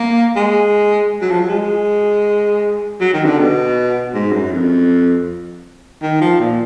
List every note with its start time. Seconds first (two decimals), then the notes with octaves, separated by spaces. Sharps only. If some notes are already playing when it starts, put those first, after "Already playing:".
Already playing: A#3
0.36 G#3
1.22 F#3
1.31 F3
1.40 F#3
1.50 G#3
3.01 F#3
3.13 D#3
3.25 D3
3.38 B2
4.14 G#2
4.33 F#2
4.52 F2
6.03 D#3
6.21 F3
6.40 A#2